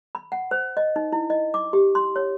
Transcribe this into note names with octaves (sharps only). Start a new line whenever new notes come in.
B5
F#5
C5
D#5
D#4
E4
D#5
D6
G4
C6
C#5